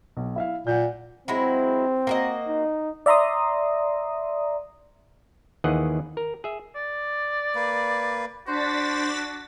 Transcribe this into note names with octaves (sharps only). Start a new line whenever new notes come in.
B1
E4 E5 F5
A#2 F#5 G6
F#3 G#3 C4 E4
A#3 F#4 D#5
D#4
D5 E5 A#5 C6 D#6
D#2 D#3 E3 G#4 D#5 F#5
A#4
G#4 E5
D5
A#3 B4
D4 F#4 C5 A6 B6